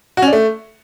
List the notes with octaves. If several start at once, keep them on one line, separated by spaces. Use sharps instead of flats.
F#4
C#4
D4
A3